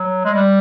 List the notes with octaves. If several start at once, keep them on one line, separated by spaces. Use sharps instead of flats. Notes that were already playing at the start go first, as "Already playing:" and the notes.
Already playing: F#3
G#3
G3